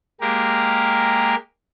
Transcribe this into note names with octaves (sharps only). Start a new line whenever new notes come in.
G#3 A#3 G4 A#4